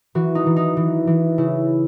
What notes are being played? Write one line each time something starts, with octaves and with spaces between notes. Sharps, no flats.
E3 F#4
D#4
E3
D#4
E3
E3
C#3 E4